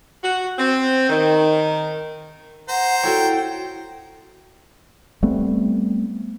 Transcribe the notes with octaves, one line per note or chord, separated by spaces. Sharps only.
F#4
C4
D#3
C5 F#5 A#5
E4 F#4 A4 C#5 G5
G3 A3 B3 C4